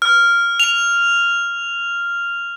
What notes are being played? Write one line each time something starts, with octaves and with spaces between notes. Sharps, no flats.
F6
F7